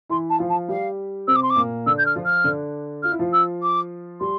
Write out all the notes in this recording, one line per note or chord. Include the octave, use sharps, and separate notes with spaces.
E3 E4 C6
A5
F3 F4
A5
G3 G4 F5
C3 C4 E6
D6
C6
D6
A#2 A#3
D3 D4 E6
G6
F6
F3 F4
F6
D3 D4
F4 F6
E4
F3 F4
E6
D6
G3 G4 C6